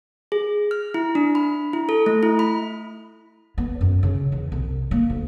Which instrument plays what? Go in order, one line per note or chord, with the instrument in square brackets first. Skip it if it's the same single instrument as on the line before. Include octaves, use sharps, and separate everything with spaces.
[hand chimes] G#4
F6
E4
D4
B5
E4
A4
A3
E4
B5
[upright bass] B3
F#2
C#3
E2
C2
A#3
D2